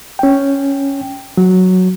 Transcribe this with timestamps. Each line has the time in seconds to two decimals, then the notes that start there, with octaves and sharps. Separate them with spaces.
0.19 C#4 G5
1.37 F#3